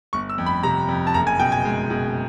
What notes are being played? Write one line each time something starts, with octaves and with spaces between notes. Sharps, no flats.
G1 C#6
E6
F2
B5
C3 A#5
F2
A5
F#1 A#5
G#5
B2 G5
G#5
G#3
B2